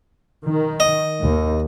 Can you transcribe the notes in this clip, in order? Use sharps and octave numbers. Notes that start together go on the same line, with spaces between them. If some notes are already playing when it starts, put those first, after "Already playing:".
D#3
D#5
D#2